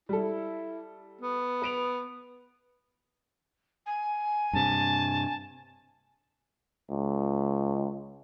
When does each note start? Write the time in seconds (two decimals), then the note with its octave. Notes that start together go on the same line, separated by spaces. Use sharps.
0.09 G3 E4 A4
1.21 B3
1.62 B4 D7 F7
3.85 G#5
4.53 G2 C3 A5
6.90 C#2